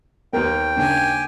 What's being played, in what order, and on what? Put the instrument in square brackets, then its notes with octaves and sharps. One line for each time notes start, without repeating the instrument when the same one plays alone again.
[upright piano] D#2 A#4 [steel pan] B3 [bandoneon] G5
[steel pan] C#3 A#3 D4 [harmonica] G4 G#5